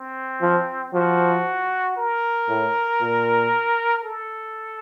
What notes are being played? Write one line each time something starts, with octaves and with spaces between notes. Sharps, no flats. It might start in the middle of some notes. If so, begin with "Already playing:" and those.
Already playing: C4
F3
F3 F#4
A#4
A2
A#2
A4